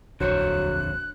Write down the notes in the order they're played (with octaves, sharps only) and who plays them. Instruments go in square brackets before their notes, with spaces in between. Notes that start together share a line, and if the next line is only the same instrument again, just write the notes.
[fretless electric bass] D#1 A#1 F2 [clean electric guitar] D3 C5 C#5 [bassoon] F#3 [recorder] F#6